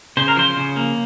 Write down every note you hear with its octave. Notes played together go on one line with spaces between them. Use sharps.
C#3 C5
A#4
F3 C5
C#3
A#3